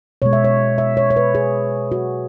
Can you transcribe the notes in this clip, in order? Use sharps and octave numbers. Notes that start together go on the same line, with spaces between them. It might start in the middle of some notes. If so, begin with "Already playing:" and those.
B2 G#3 C#5
E5
C#5
E5
C#5
C#5
B4
G#4
F#4